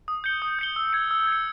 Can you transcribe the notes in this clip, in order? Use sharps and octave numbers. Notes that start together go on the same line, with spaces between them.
D#6
G6 C#7 G7
D#6
G6 C#7 G7
E6
G#6 C#7
E6
G#6
C#7